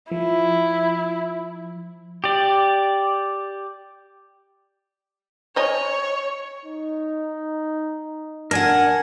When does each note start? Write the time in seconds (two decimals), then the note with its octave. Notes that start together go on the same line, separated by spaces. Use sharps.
0.11 F3 E4
2.24 G4 D5
5.56 C5 C#5 D#5 G#5
6.65 D#4
8.51 D4 A#4 F#5 G#5